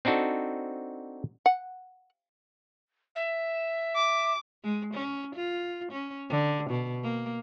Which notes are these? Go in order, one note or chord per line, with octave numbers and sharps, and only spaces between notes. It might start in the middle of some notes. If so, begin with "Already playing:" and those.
C4 D4 D#4 F#4 A4
F#5
E5
D6
G#3
C#4
F4
C#4
D3
B2
A#3